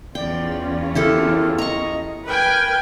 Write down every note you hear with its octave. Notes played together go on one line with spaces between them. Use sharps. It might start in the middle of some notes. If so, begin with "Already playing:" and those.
E2 C#4 F4 D5 G5
E4 G4 A4 A#4
D#5 A#5 C#6
A#4 B4 G5 G#5